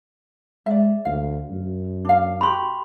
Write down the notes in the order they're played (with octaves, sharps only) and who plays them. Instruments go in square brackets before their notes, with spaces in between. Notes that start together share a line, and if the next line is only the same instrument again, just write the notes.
[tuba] G#3 [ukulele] D5 E5
[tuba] D2 [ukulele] F5
[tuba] F#2
[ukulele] D4 F5
[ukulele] F#4 G4 A#4 [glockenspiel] B5 C6